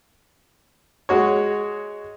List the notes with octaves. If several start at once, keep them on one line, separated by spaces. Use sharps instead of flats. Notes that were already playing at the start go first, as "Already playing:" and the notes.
G#3 F#4 C#5